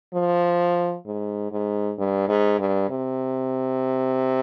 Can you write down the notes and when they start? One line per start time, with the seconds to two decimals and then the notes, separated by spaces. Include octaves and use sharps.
0.14 F3
1.06 G#2
1.52 G#2
1.98 G2
2.28 G#2
2.59 G2
2.89 C3